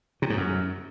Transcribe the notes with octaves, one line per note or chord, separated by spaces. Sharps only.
C3
G#2
F#2